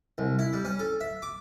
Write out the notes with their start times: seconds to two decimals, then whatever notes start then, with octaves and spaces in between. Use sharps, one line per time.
0.18 C2
0.39 E4
0.53 G3
0.65 C#4
0.79 A4
1.01 E5
1.22 D6